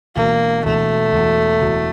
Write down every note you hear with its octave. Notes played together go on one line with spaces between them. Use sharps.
E1 E2 B2 A#3
E1 E2 B2 A3
E1 E2 B2
E1 E2 B2